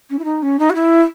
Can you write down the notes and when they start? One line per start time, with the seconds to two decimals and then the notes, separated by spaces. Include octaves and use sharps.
0.10 C#4
0.19 E4
0.24 D#4
0.42 C#4
0.59 D#4
0.70 F#4
0.75 E4